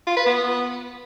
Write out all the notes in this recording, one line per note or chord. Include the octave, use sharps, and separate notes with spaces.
F4
B4
B3